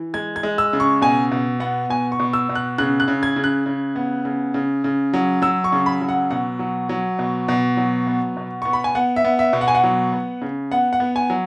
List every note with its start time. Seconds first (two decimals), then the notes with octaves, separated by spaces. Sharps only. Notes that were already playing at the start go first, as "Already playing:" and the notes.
Already playing: E3
0.14 G#3 G#6
0.36 G#6
0.43 G#3
0.58 E6
0.73 C#3
0.80 C#6
1.02 B2 G#5
1.32 B2
1.60 B3 F#5
1.90 B2 G#5
2.12 C#6
2.19 B2
2.33 E6
2.49 B2
2.55 F#6
2.78 C#3 F#6
3.00 F#6
3.08 C#3
3.23 G#6
3.36 C#3
3.44 F#6
3.66 C#3
3.96 B3
4.25 C#3
4.54 C#3
4.84 C#3
5.13 F#3
5.42 F#3 E6
5.64 C#6
5.72 C#3
5.86 B5
6.01 F#3
6.09 F#5
6.31 B2 F#5
6.59 F#3
6.89 F#3
7.19 B2
7.48 B2
7.77 F#3
8.07 B3
8.37 B2
8.62 B3 C#6
8.73 B5
8.84 G#5
8.95 B3 F#5
9.16 E5
9.25 B3
9.39 E5
9.53 B2
9.61 F#5
9.68 G#5
9.75 F#5
9.83 F#3
10.12 B3
10.42 C#3
10.71 B3 F#5
10.93 F#5
11.00 B3
11.16 G#5
11.30 F#3